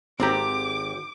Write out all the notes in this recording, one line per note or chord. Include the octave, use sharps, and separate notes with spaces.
G#1 C4 G4 A4 A#5 D6